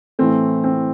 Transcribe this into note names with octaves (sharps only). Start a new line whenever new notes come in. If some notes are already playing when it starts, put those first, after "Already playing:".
A2 E3 A3 C4
C4